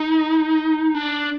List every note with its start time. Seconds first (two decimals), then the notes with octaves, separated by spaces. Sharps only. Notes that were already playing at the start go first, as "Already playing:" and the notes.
Already playing: D#4
0.95 D4